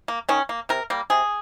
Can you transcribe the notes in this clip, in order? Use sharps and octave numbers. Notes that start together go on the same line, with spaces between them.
A#3
D#3 C#4
A#3
C3 A#4
G3 A#3
C3 G#4